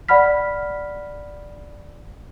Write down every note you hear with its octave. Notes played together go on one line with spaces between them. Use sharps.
D5 F#5 B5 F6 B6